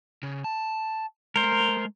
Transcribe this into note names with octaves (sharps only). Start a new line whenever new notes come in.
C#3
A5
G#3 A3 A#4 C5